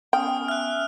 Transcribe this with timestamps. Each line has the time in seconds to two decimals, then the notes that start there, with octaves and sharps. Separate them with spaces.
0.13 B3 C#4 G5 G#5 D#6 F6
0.48 E5 F6 F#6